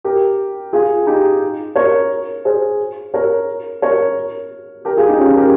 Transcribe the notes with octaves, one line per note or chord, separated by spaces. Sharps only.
G4 A#4
F4 G#4
D#4 G4
A#4 C#5
G#4 C5
A#4 C#5
A#4 C#5
G4 A#4
F4 G#4
D#4 G4
C#4 F4
G4 A#4